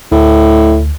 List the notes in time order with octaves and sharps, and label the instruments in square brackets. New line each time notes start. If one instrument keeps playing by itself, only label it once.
[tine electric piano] D2 [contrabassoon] A2